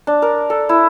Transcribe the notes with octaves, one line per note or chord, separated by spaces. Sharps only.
D4
A#4
A4
E4